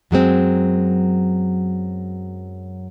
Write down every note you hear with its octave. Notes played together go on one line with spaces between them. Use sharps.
F#2 F#3 G#3 C4